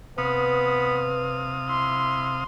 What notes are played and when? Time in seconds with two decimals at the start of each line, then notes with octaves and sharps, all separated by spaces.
0.18 C3 B3 B4 F5 D#6
1.68 E4 C6